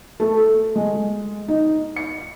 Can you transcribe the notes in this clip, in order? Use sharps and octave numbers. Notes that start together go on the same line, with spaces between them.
A3
G#3
D#4
C#7